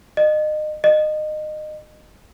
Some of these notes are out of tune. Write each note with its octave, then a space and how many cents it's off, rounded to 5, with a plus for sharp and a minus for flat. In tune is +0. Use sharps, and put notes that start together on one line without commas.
D#5 -30
D#5 -25